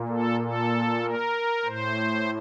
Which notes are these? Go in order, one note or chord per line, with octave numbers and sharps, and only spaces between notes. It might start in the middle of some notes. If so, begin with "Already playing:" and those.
Already playing: A#2
A4
A4
A#4
A2 C5